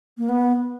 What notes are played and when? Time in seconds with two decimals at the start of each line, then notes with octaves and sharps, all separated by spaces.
0.18 A#3
0.29 B3